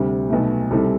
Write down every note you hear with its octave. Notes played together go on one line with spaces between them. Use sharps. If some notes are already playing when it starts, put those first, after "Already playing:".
Already playing: D2 C3 G3
B1 B2 A3
C2 C3 G3 A4